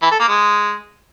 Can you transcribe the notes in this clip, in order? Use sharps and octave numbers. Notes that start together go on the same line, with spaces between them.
E3
A4
A#3
G#3